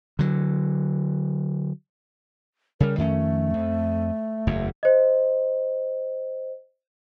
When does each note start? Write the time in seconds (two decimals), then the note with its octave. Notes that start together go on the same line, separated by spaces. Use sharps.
0.19 D3 F#3
2.80 C#3 G3 A#4
2.98 F2 D#3 A3 C#4
3.54 F2
4.47 F#1 E2
4.83 C5 D#5